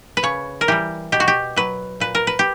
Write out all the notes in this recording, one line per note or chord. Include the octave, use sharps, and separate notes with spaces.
B4
C#3 C#5
A#4
E3 G3 G4
B2 G4
F#4
G4
F#3 B4
A#2 B4
A#4
B4
G4